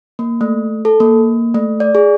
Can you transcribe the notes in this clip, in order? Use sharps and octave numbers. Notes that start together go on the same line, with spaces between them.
A#3
A3
A4
A#3
A3
D5
G#4